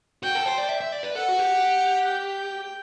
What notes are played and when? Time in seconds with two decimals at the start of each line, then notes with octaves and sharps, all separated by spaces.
0.23 F#4 G5
0.35 A4
0.46 C5
0.58 D5
0.69 E5
0.81 E5
0.92 D5
1.03 B4
1.15 A4 F#5
1.29 F#4
1.39 G4
2.07 G5